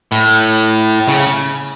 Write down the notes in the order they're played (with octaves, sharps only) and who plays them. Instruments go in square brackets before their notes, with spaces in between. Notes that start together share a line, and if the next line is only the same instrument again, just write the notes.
[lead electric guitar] A2
C#3